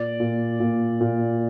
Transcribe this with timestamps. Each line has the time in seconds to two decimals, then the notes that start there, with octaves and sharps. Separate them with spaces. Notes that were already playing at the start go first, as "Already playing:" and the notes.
Already playing: A#2 D5
0.20 A#2
0.60 A#2
1.01 A#2